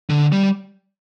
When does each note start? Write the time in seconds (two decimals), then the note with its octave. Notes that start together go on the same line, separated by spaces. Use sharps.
0.10 D3
0.32 G3